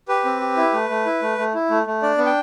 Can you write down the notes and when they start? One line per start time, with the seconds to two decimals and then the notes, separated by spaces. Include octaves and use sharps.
0.08 G4 B4
0.25 C4
0.41 G4
0.57 E4
0.73 A3
0.89 A3
1.06 E4
1.22 A3
1.38 A3
1.54 E4
1.70 A3
1.87 A3
2.02 D4 D5
2.18 B3
2.26 G5